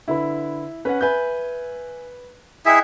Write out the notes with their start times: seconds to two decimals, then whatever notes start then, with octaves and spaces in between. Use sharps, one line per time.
0.08 D3 E4 B4 B5
0.85 C#4 B4 F#5
1.01 B4 E5 G#5 G6
2.66 E4 G#4 D#5 E5 G5 F#6